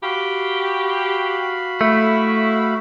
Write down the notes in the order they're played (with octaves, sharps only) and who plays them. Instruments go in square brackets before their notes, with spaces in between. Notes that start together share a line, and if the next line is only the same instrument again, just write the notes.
[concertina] F#4 F5 B5 [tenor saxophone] G4
[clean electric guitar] A3 [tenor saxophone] E4